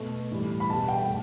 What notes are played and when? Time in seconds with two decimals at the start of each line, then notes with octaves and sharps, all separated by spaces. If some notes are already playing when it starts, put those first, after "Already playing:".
Already playing: B2 A3
0.31 A2 E3 G3
0.60 B5
0.70 B2 G3 A5
0.88 G5
1.07 A2